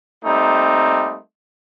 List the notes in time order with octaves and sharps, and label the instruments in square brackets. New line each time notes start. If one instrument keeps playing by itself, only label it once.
[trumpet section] G3 A3 A#3 C4 D#4